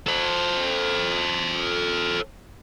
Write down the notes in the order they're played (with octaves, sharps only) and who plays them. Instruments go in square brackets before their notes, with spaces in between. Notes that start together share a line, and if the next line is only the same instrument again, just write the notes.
[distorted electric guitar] A4 C5